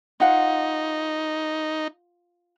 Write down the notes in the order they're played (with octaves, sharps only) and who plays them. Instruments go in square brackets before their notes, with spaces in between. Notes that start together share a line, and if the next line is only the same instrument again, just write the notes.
[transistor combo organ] D#4 [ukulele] F4 F5 F#5